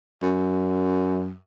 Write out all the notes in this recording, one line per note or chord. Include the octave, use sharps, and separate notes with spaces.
F#2